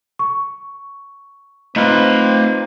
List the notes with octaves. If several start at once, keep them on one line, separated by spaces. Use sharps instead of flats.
C#6
A3 C4 D#4 F4 B4 F5